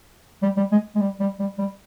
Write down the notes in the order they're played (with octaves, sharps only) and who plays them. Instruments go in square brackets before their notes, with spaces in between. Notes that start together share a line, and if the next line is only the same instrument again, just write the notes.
[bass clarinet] G3
G3
G#3
G#3
G3
G3
G3
G3